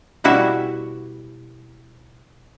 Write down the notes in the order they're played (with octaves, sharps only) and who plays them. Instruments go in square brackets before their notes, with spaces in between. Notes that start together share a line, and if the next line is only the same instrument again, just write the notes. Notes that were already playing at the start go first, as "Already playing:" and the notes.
[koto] B2 G3 E4 F#4 E5